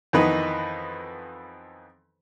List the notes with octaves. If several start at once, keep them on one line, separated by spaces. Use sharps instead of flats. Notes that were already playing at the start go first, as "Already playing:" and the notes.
F2 D#3 E3 B3 D#4 B4